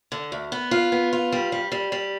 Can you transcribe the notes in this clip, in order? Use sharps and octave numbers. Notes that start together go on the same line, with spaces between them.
D3
D2
B3
F4
B3
F4
G3
G3
G3
G3